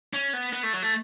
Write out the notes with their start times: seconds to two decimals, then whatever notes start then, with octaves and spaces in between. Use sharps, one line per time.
0.13 C#4
0.33 B3
0.53 B3
0.63 A3
0.73 F#3
0.82 A3